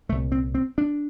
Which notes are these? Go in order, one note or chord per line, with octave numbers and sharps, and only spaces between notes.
C2 A#2 A3
C4
C4
D4